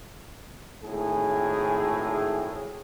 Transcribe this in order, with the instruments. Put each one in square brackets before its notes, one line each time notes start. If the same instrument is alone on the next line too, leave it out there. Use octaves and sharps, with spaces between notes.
[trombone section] G#1 A2 G#4